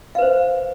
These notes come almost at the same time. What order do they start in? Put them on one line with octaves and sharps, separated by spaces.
F5 B4 C5